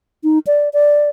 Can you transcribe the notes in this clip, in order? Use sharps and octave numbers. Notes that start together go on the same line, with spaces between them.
D#4
D5
D5